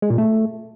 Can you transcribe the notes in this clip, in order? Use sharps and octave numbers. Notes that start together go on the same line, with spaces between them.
G#3
A#2
A3